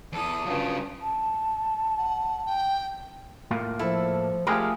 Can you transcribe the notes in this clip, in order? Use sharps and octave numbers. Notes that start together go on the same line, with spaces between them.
E2 E3 A4 D#6
G2 C#3 F#3 F4
A5
F#5
G5
A2 A#3 F4
F3 E4 A4
G#3 A3 F4 G4 G#4 A#4